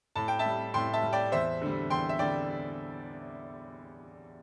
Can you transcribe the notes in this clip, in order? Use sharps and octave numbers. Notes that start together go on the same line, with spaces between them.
A2 A5
G5
E5 A5
G3
A2 G5 C6
E5 A5
G3
D5 G5
E2 C5 E5
D3 G3
E2 G5 C6
E5
D3 G3 D5 G5